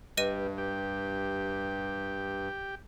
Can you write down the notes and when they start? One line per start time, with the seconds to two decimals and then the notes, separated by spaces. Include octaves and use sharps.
0.17 G2 G3 B4 D#5 D#7
0.58 G4